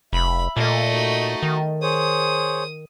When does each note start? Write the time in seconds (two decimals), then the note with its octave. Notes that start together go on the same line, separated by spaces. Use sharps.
0.13 F1 E5 B5
0.57 A#2 A3 D#5
0.92 D#4 F#4
1.43 D#3
1.82 G#4 C5 C#5 D#6